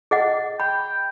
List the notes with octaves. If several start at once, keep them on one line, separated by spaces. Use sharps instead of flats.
G#4 D#5 F#5
G5 B5